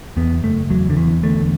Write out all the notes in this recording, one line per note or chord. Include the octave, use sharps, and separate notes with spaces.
E2 B3
F#1 A3
E2 F#3
D3
E2 E3
D3 A3